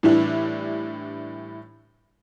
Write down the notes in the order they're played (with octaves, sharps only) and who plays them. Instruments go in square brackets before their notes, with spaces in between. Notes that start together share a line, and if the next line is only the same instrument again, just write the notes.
[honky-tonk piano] A2 E3 G3 D4 E4